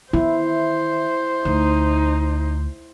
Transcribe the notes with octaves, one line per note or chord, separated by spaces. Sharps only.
D#3 B3 E4 C5
D2 D#4